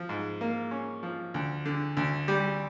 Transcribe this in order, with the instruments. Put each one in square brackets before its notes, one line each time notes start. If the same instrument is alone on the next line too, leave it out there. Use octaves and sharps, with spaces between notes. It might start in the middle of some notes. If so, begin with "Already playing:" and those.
Already playing: [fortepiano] F3
G#2
A#3
C#4
F3
D2
D3
D2
G3